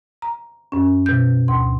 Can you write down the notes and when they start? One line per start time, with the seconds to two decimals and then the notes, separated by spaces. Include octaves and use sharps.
0.22 A#5
0.72 F#2 C#4
1.06 B2 G6
1.48 D2 C6